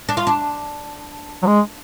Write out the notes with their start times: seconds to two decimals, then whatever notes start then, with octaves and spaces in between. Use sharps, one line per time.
0.09 D4
0.17 F4
0.27 D4
1.42 F#3
1.47 G#3